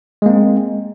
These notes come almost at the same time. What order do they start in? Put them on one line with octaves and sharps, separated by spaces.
G#3 A#3 C4